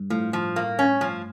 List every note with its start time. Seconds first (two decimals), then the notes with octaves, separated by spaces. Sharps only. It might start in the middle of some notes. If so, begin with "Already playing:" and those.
Already playing: G2
0.10 A2 F3
0.33 F3
0.56 A#3
0.79 C#4
1.01 F3